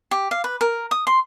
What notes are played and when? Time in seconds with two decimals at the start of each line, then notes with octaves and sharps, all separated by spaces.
0.11 G4
0.31 F5
0.44 B4
0.61 A#4
0.91 D#6
1.07 C6